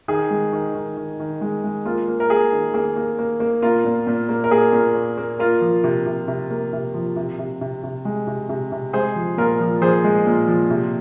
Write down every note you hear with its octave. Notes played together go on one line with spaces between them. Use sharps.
D#3 G#4
G#3
D#3
D#3
D#3
D#3
G#3
G#3
A#3 F4
A#3
A#4
A#3 G#4
D#3
A#3 G#4
A#3
A#3
A#3
A#2 F4 A#4
A#2
A#2
A#3
A#4
A#3 G#4
A#2
A#3
A#3
A#3 F4 A#4
F3
C3
C3
C3
A#3
C3
F3
C3
C3
C3
C3
G#3
C3
C3
C3
G#3 G#4 C5
F3
A#2 F4 A#4
F3
F3 G#4 C5
G#3
A#2
F3
C3